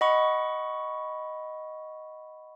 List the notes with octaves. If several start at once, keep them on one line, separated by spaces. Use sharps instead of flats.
D#5 F#5 B5 C#6